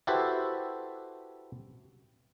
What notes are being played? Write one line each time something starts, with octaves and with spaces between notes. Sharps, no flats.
E4 F#4 G4 A4 B4 C5